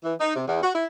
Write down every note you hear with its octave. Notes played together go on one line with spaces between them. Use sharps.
E3
D#4
C3
E2
F#4
E4